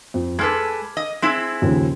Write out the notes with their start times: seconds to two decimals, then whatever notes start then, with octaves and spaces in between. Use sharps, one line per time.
0.14 F2
0.39 G#3 A4 B4 D6 F6 G#6
0.97 D#5
1.22 G#3 C4 E4
1.62 D#2 C#3 F3